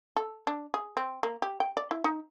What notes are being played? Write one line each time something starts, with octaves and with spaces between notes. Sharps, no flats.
A4
D4
G#4
C4
A#3
G4
G5
D5
E4
D#4